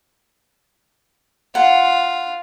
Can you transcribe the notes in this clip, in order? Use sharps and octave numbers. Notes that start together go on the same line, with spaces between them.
F4 F#5